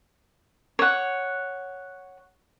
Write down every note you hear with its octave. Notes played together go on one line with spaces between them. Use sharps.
C#5 F#5